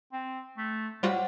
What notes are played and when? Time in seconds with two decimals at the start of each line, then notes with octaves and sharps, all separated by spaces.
0.12 C4
0.58 A3
1.03 A2 G3 F4 F#4 C5 F#5